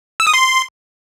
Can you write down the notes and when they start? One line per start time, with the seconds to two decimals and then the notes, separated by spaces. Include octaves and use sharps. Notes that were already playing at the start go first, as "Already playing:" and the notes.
0.20 E6
0.27 D#6
0.34 C6